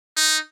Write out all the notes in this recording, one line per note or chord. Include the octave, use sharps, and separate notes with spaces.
D#4